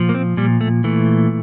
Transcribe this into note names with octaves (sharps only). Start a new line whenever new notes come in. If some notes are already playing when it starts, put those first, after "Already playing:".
Already playing: A#2 F3
A#3
C4
A#2 G3
A3
E3 A3